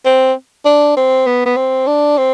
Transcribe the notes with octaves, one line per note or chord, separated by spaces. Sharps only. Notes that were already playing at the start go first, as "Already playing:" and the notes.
C4
D4
C4
B3
B3
C4
D4
C4